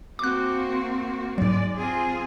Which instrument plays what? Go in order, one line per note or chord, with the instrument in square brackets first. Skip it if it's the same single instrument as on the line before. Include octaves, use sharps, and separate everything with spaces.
[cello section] A#3 C4 F#4 [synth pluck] D6 F#6
[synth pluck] G#2 F#3 [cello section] G#3 D5
[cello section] C4 F4 G#4